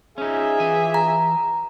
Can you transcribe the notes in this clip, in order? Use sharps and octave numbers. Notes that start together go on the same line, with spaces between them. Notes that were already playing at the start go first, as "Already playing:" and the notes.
C#4 D#4 F4 G#4 E5
E3 G#5
A#5